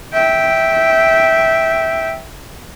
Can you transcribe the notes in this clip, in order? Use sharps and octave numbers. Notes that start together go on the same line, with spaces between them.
E5 G5